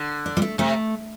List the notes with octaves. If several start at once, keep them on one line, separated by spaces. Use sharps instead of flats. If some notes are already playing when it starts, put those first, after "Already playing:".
Already playing: D3
D4
G3
A3
C3 A3